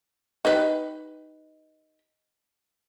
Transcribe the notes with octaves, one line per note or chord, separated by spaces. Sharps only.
D#4 G4 B4